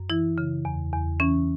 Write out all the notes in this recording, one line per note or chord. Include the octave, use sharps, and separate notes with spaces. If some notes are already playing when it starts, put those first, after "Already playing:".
Already playing: F#2
E3 E4
C#3
E2
E2
E3 C#4